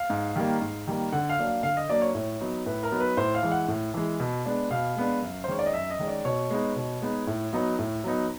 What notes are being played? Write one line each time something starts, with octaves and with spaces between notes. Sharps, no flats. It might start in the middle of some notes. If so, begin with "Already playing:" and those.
Already playing: F5
G#2
D#3 G3 A#3
G#2
D#3 G3 A#3
D3 F#5
F5
F#3 A#3 D4
F5
D3 F5
D#5
F#3 A#3 D4 D5
C#5
A2 C#5
F#3 B3 D#4
A2 B4
A#4
F#3 B3 D#4
B4
A2 C5
F5
E3 G#3
F#5
A2
E3 G#3
B2
G#3 B3 D4
B2 F5
G#3 B3 D4
F#2
C5
D#3 G#3 C#4 C#5
D5
D#5
F#2 E5
D#5
D#3 G#3 C#4
D5
B2 C#5
G#3 B3 D#4
B2
G#3 B3 D#4
A2
F#3 B3 D#4
A2
F#3 B3 D#4